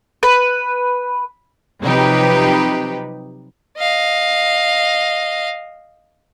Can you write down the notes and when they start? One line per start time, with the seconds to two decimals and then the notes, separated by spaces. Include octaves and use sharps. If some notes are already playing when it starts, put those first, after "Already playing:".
0.23 B4
1.82 C3 F3 F#3 D#4 G4 B4
3.78 D#5 F5